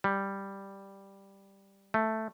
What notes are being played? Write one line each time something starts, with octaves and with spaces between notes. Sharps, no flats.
G3
A3